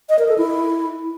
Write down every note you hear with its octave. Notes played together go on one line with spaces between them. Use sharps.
D#5
A#4
A4
E4